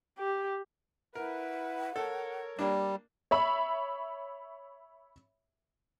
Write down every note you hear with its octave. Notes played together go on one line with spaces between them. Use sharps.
G4
E4 A#4 B4 F#5
A4 A#4 C#5
G3 A#3 D4
C#5 E5 B5